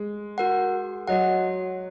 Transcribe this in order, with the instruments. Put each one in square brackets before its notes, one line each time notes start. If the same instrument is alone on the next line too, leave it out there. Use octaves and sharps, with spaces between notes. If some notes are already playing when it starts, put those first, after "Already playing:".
Already playing: [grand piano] G#3
[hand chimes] F#4 A#4 F#5
[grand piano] F#3 [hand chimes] F#4 D#5 F#5